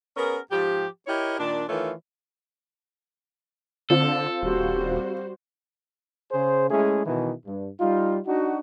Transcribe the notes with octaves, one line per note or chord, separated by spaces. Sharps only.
B3 C#4 G#4 A#4
G#2 F3 G4
E4 G4 A#4 C#5 D#5
A#2 D#3 D4
D#3 E3 A3 F4 C#5
D3 C4 F4 A4
D#1 G3 F#4 C5
C#3 G#4 C5
G#3 A3 C#4 E4 G#4
B2 D#3 E3
G2
G3 D#4 F4
D4 D#4 F#4